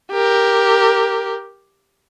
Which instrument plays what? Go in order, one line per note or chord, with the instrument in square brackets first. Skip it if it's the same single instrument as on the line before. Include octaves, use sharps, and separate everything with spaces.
[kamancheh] G4 A#4